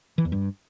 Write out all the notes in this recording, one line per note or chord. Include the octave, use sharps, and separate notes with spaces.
E3
E2
G2